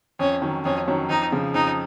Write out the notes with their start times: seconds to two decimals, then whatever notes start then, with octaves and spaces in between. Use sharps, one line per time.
0.19 F2 C#4
0.42 D#3 F#3 C#4
0.65 F2 C#4
0.88 D#3 F#3 C#4
1.10 F2 D#4
1.32 C#3 F3
1.54 F2 D#4